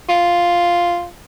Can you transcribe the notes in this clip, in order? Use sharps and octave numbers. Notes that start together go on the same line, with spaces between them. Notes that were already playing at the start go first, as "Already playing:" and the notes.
F4